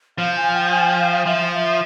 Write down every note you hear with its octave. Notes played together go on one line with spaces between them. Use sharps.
F3 F5
G#5
G5
G#5
G5
F5
F5
F3 E5